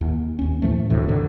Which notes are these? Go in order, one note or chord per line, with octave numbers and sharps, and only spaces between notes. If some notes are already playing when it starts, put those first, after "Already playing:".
D#2
D#2 C#4
A2 E3 F3 A3
D#1 D2 A2 C3
G#2 D3 D#3